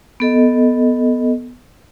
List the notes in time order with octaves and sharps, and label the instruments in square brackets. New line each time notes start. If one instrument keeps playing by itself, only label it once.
[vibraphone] B3 A4 D#5